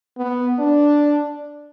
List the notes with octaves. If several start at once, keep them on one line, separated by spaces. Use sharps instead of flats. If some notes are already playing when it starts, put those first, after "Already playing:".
B3
D4